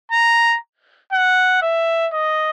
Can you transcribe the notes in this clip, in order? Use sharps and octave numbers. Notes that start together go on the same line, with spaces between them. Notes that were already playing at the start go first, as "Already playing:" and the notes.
A#5
F#5
E5
D#5